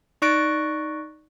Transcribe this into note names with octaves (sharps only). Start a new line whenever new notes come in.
D#4 D5 C#6 F#6 A#6 D7